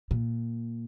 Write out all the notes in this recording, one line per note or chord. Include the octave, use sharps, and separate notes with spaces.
A#2